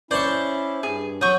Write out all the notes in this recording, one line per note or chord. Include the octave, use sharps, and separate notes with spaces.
C#4 E4 C5 D5 A5 C#6
G2 G#4
F#3 C#6 D#6 G6